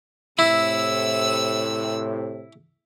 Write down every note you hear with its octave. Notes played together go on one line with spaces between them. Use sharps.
A2 C3 E4 E6